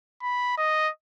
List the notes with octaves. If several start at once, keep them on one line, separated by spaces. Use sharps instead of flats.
B5
D#5